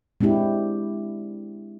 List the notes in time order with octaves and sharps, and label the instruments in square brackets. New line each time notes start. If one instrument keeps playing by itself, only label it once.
[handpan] G#3 C4 D4 E4 G4